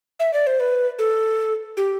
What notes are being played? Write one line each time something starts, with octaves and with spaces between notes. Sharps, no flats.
E5
D5
C5
B4
A4
G4